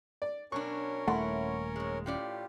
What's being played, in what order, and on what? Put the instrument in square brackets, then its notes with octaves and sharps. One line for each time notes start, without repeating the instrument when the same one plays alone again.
[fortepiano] D5
[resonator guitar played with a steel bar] B2 F#3 D4 [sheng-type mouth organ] C#4 A#4 C#5 [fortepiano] C#6
[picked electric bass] D#1 A3 [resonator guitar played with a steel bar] E4 [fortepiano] F#5 C6
[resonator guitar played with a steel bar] G#2 G#3
[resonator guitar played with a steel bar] A2 C#4 D5 [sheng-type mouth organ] F4 G4